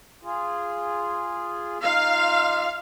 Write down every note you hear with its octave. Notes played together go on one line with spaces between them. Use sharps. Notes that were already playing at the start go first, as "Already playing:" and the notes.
F4 G#4
D#4 F4 F5